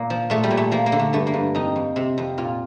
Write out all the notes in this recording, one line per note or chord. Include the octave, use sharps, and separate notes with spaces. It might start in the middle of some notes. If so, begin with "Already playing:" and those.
Already playing: A#2 A#3
F3
A#2 A3
G3
A#2
A3
F3 A#3
A#3
D3
A3
G2 A3
A#3
G2
F2 D#4
F2
C3
F2
A#2 F4